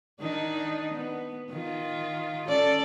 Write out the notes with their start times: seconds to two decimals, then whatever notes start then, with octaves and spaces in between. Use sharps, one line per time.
0.20 D#3 D4 D#4
0.94 B3
1.50 D#3 F4
2.48 C#4 A4 D5